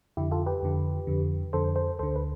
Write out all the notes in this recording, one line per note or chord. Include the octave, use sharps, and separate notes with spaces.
F2 D3 E4 G4
F4 A4
G4 B4
F2 D3
F2 D3
F2 D3 A4 C5
A4 C5
D2 D3 A4 C5
B4